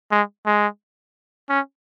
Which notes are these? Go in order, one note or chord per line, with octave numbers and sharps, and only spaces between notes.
G#3
G#3
C#4